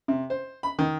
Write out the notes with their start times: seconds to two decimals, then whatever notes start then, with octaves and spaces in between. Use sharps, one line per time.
0.08 C3
0.30 C5
0.63 B5
0.79 D#3